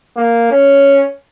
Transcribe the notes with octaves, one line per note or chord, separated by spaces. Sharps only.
A#3
C#4